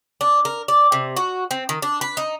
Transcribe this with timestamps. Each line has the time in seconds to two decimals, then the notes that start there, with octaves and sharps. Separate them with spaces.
0.21 D4
0.45 A#4
0.68 D5
0.92 C3
1.17 F#4
1.51 C4
1.69 D#3
1.82 D4
2.01 B4
2.17 D#4